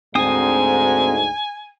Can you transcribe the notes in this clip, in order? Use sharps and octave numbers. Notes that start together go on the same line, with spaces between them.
D2 G#2 C4 G#5 D#6